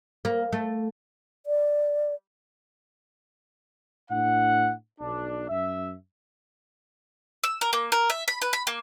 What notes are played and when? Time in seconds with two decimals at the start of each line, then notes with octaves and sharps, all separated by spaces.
0.25 A#3
0.52 A3
1.46 D5
4.10 A2 D4 F#5
5.00 B1 D4
5.49 F#2 E5
7.44 E6
7.61 A#4
7.73 A#3
7.92 A#4
8.10 E5
8.28 B5
8.42 B4
8.53 B5
8.67 A#3